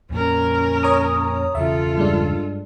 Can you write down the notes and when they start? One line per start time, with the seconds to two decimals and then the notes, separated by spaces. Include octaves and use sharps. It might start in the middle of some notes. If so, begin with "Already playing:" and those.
0.10 F2 A#2 C#4 A#4
0.83 C#5 A#5 D#6
1.55 E1 C#3 F4 A4 E5
1.97 G2 G#3 D4